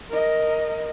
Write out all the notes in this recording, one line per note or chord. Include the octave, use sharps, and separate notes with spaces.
A#4 D#5